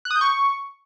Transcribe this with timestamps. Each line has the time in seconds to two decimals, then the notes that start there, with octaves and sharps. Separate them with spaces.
0.05 F#6
0.11 D#6
0.16 G6
0.21 C#6